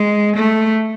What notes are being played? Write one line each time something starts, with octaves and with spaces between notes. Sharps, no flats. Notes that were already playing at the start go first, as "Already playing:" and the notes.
Already playing: G#3
A3